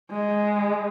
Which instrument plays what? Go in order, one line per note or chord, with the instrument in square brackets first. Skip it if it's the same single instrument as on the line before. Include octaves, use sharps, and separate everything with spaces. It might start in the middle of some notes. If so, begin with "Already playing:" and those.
[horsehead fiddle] G#3